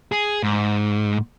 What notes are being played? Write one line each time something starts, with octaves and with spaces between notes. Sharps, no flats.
G#4
G#2